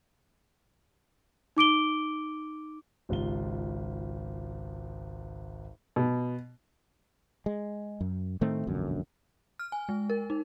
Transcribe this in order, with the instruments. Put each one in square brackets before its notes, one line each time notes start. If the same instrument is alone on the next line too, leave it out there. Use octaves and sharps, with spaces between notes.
[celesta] D#4 D6 D7 G7
[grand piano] G#1 C#2 F4 G4 G7
[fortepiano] B2
[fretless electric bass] G#3
F#2
A2 D#3 A3 C4
E1 A#1 F#2 D3
[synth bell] F6
G#5
G#3
A#4
D#4